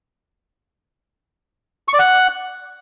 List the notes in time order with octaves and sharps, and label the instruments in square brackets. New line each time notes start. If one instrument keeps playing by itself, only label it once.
[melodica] C#6
D5
F#5